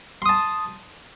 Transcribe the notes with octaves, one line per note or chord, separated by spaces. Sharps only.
A5 C6 D#6